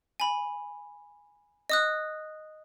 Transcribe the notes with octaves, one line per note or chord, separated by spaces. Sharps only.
G#5 B5
D#5 D#6 F#6